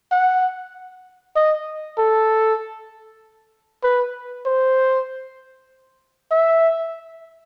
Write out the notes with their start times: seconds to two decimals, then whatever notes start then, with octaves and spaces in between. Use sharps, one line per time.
0.12 F#5
1.36 D#5
1.98 A4
3.83 B4
4.46 C5
6.31 E5